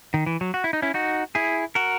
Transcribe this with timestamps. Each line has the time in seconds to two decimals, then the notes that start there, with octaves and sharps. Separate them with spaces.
0.14 D#3
0.26 E3
0.41 F#3
0.54 F#4
0.64 E4
0.73 D#4
0.82 C#4 E4
0.94 D#4 F#4
1.35 E4 G#4
1.75 F#4 A#4